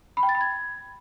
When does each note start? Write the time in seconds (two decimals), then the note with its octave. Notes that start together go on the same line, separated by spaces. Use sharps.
0.17 B5
0.23 G5
0.29 A6
0.35 B5
0.41 G#6